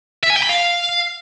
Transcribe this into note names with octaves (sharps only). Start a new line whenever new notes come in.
E5
G#5
G5
B5
F5